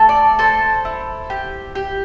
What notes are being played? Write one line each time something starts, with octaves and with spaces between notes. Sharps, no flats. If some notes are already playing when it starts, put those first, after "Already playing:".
Already playing: A3 A4
D5
A4 C5
E4
G4
G4